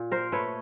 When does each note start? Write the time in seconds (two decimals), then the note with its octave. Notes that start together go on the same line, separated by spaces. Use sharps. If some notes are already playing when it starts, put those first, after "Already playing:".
Already playing: A#2
0.12 A#4 C5
0.32 A3 B4 C#5